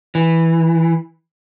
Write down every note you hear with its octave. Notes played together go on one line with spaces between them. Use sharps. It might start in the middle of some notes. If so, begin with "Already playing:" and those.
E3